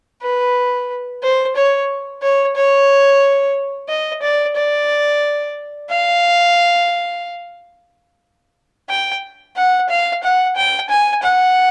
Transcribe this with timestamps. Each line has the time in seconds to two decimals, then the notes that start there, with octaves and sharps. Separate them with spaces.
0.22 B4
1.23 C5
1.56 C#5
2.22 C#5
2.56 C#5
3.89 D#5
4.23 D5
4.56 D5
5.90 F5
8.90 G5
9.57 F#5
9.90 F5
10.23 F#5
10.56 G5
10.90 G#5
11.23 F#5